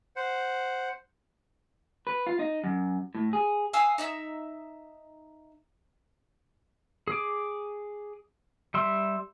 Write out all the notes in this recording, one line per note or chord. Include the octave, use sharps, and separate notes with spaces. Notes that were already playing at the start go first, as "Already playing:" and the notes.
C5 F#5
B4
F4
D#4
F#2
A2
G#4
F5 G#5 D#6 E6
D#4 E5 E6
G#4 D6
G3 E5 C6